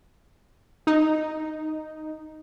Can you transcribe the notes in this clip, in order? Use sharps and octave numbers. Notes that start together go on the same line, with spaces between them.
D#4